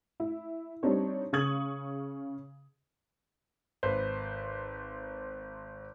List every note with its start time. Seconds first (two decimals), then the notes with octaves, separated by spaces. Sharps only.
0.20 E4
0.83 G3 C4 D4 D#4 C#5
1.33 C#3 G#4 C#6 D#6 G#6 F#7
3.83 G#1 B4 C5